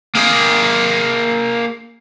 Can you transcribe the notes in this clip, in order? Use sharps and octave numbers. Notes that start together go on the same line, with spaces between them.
A#3 G#4